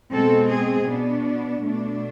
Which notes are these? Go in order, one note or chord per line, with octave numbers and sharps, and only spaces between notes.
B2 G#3 C4 A4
G#4
B2 B3 D4
B2 A3 D4